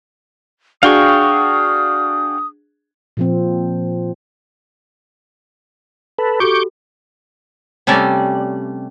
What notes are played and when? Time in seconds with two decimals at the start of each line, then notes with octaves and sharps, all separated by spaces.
0.83 D4 F#4 G#4 F5 G5 C#6 D#6
3.17 A#2 F3 C4
6.18 A4 B4
6.40 F#4 G4 A4 C#6 D6 G6
7.87 C3 G3 A3 C#4 D5